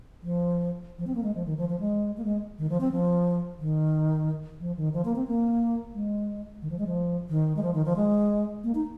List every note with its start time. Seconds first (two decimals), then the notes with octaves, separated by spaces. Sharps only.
0.23 F3
0.98 F3
1.07 C4
1.15 A#3
1.23 G#3
1.35 F3
1.46 D#3
1.58 F3
1.69 F3
1.80 G#3
2.17 A#3
2.24 G#3
2.58 D#3
2.70 F3
2.81 C4
2.92 F3
3.59 D#3
4.60 F3
4.77 D#3
4.94 F3
5.05 A#3
5.16 C4
5.27 A#3
5.94 G#3
6.62 D#3
6.70 F3
6.79 G#3
6.87 F3
7.29 D#3
7.56 G#3
7.63 F3
7.74 D#3
7.85 F3
7.96 G#3
8.64 A#3
8.75 D#4